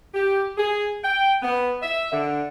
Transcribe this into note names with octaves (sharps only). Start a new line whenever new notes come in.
G4
G#4
G5
B3
E5
D3